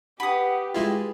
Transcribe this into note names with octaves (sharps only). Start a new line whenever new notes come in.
G4 B4 F#5 D#6
G#3 E4 F4 G#4